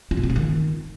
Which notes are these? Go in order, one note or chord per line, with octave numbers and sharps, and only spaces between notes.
F4
B2
C4
B3
D#3